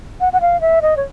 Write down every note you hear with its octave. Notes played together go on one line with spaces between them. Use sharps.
F#5
F#5
F5
E5
D#5
C#5